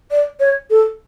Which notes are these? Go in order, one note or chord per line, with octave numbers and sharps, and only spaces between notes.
D5
C#5
A4